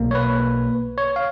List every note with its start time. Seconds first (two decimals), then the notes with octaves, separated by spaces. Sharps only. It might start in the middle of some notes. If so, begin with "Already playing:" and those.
Already playing: B1 B2 A#3
0.11 C#5
0.15 B4
0.98 C#5
1.16 F5